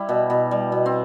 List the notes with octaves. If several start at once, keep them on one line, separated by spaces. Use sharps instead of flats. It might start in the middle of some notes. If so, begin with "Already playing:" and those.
Already playing: G3 E4
B2
B2
G3
B2
C4